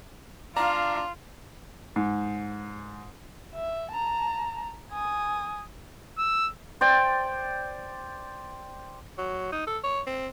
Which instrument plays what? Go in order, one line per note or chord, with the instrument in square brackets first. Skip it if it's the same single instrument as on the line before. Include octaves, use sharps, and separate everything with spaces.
[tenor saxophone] D4 [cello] F4 [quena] F5 [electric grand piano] A#5
[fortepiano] G#2
[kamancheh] E5
A5 A#5
G#5 D#6
[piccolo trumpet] E6
[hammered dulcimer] C5 D5 G5
[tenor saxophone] F#3
D#4
A4
C#5
C4